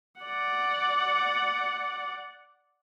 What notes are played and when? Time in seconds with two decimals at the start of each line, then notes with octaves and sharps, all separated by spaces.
0.21 D5 F#5